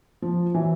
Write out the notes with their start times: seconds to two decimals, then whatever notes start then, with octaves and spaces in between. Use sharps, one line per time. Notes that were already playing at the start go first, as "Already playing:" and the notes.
0.22 F3
0.54 E3 F#3